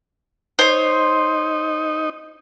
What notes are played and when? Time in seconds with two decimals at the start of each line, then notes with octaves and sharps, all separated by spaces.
0.59 D#4 C5 C#5